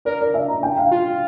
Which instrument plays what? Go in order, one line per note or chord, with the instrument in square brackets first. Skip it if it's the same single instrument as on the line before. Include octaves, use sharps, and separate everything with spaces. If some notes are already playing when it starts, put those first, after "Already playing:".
[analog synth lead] A#4 [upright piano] D5
[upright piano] D5
E5
A#5
G5
F5
[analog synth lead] F4